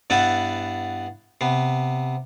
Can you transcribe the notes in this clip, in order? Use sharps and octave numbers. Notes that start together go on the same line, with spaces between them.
G2 B3 E4 B4 F#5 A5
C3 B3